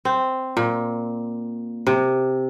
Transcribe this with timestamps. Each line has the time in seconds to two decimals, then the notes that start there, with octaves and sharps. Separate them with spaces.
0.05 C4
0.57 A#2
1.87 C3